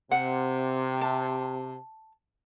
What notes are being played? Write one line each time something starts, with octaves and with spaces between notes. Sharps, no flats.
C3 F#5
A5